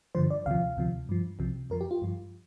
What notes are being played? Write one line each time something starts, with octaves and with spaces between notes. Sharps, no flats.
G2 D3 F3 C5
D5
D2 C3 F3 F5
D2 C3 F3
G2 F3
C2 C3 F3
F2 F3 A#4
G4
F4
G2 F3